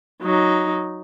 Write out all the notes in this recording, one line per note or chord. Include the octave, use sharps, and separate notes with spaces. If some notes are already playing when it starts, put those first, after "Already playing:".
F#3 D#4